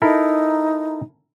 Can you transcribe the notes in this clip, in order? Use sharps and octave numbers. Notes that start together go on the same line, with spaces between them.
D#4 E4 A4 A#4